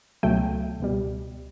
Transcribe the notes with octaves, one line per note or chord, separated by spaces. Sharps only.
C#2 B2 F#3 A3 G5
C#2 B2 G3